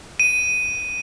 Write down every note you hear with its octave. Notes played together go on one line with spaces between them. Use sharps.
D#7